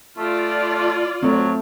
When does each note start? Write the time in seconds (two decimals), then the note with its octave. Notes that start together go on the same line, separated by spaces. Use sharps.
0.18 A3 F4 D5
1.23 F#3 A3 C4